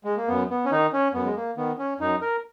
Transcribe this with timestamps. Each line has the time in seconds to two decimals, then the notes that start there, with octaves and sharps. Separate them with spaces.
0.04 G#3
0.17 A#3
0.28 F#2 B3
0.50 B3
0.66 C#4
0.71 D#3 D#4
0.93 C#4
1.13 F#2 B3
1.25 G#3
1.36 A#3
1.57 D#3 B3
1.79 C#4
1.99 F#2 D#4
2.21 A#4